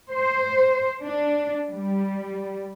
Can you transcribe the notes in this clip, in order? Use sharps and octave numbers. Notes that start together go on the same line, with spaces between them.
C5
D4
G3